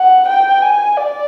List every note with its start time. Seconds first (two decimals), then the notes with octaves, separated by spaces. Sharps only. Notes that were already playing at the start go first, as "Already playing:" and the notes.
Already playing: F#5
0.27 G5
0.62 G#5
0.97 D5